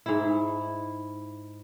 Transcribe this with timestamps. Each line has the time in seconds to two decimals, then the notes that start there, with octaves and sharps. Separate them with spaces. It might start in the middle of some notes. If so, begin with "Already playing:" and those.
0.06 G#2 E4